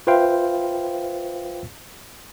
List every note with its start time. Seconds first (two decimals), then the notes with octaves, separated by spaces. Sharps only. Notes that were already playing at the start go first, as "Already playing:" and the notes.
0.07 F4 B4 C5 E5 F5 G5